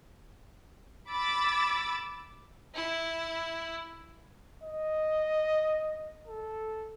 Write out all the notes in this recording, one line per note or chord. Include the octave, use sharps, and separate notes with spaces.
B5 D6 E6 A6
E4
D#5
A4